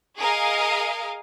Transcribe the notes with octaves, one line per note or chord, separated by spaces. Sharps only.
G#4 A#4 D#5 F5